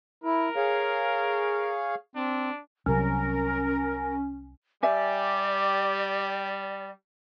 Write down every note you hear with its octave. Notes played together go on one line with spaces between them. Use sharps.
E4 A#4
G#4 C#5 F5
C4 D4
C2 C3 F#3 C#4 A#4
G3 G4 D5 E5 G#5 D6